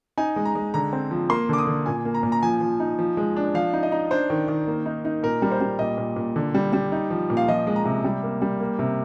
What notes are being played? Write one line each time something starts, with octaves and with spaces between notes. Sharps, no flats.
D#4 G#5
G#3
A#5
G#3
D3 A#5
C4
F3
A#3 C6
D3 D6
D#6
D3
A#2 G#5
A#3
A#5
A#2
A#5
F3 G#5
F3
D#4
F3
G#3
D4
F3 F5
D#4
D#5
D#4
D4 C5
D#3
D#3
A#3
D#4
D#4
A#2 A#4
G3 A#4
C5
G3
A#2 D#5
A#2
A#2
D3
G3
G3
D#4
F3
A#2
F5
F3 D#5
G#3
A#5
C3
G3
A#3
G3
A#3
C3